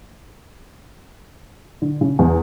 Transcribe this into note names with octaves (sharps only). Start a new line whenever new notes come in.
D3
C#3
E2